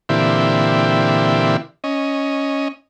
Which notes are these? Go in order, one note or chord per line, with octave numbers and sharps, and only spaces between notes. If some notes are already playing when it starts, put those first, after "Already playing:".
A#2 D3 E3 C4 E4 G4
C#4 D#5